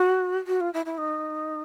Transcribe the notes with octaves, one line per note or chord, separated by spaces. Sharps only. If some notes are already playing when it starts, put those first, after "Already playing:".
Already playing: F#4
F#4
F4
E4
E4
D#4